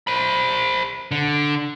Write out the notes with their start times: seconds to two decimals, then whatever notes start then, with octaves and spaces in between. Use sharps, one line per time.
0.07 C5 B5
1.11 D3